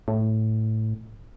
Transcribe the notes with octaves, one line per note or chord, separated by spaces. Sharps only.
A2